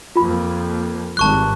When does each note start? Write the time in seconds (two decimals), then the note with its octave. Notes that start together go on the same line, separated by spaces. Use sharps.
0.16 F2 A#3 F4 B5
1.17 G#1 G2 A5 C#6 F#6